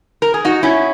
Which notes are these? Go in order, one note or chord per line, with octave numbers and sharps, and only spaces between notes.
A#4
G#4
D#4 F#4
C#4 E4